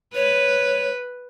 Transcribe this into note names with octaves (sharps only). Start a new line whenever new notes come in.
B4 C#5